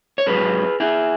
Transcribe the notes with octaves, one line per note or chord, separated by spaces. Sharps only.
C#5
G#2 F#3 G#4 B4
E4 G#4